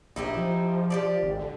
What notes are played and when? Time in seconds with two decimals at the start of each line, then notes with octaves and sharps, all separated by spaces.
0.16 A#1 D#4 E4 G4
0.37 F3
0.90 G4 A4 D5
1.22 G#1
1.39 D3